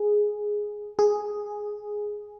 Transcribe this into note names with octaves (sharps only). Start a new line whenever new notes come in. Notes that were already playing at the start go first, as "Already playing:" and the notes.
Already playing: G#4
G#4